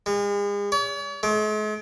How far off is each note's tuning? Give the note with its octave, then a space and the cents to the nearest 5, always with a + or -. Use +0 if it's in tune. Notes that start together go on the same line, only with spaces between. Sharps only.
G#3 -40
C#5 +45
G#3 +45